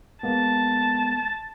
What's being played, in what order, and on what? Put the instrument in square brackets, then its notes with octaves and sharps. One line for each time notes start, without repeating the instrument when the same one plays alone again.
[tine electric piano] G#3 A#3 B3 [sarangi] A5